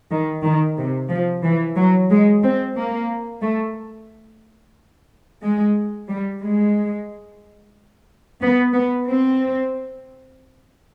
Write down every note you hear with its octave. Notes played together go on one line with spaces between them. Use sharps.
D#3
D#3
C3
F3
E3
F#3
G#3
C4
A#3
A3
G#3
G3
G#3
B3
B3
C4